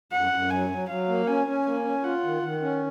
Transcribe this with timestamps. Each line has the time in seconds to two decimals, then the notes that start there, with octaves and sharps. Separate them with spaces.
0.12 F#2 F#5
0.31 F#2
0.50 F#3 G#5
0.70 F#3
0.89 F#3 F5
1.08 A#3
1.27 C#4 G#5
1.47 C#4
1.65 A#3 G#5
1.85 C#4
2.04 F4 F#5
2.23 D#3
2.43 D#3
2.62 C#4